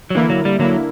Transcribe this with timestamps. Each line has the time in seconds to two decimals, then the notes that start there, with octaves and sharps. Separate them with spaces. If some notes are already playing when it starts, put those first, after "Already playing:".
0.10 F#3
0.15 D3 E3 A#3 E4
0.30 F#3
0.45 G3
0.59 D3 F#3 A#3 E4